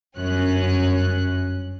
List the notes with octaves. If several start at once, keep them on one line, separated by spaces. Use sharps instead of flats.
G1 F#2 C#4 F#6